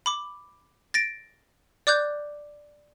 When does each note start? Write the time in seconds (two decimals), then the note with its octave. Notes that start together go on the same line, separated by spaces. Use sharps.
0.06 B5 D6
0.94 A6 A#6 D7
1.87 D5 D6 F#6 G6